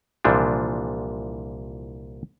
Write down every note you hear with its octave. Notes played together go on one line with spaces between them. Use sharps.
C2 A#2 E3 F3 D4